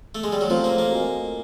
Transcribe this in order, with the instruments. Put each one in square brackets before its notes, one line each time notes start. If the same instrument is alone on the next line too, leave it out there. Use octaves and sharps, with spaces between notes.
[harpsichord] A3
G#3
G3
F#3
[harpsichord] F3 [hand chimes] A3 C4 F4 A4 C5
[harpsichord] A#3
A#3
[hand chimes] F#4 A#4 D#5 G#5